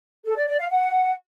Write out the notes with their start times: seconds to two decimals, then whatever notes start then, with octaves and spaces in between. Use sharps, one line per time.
0.24 A4
0.35 D5
0.47 D5
0.58 F5
0.70 F#5